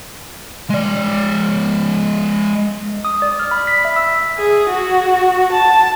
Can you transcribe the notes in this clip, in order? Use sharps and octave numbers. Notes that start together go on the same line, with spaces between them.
G#3 D5
D#6
D5
F6
B5
B6
E5
E6
G#4
F#4
A5